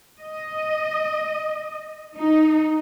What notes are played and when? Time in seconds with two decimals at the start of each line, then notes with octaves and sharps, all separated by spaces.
0.21 D#5
2.17 D#4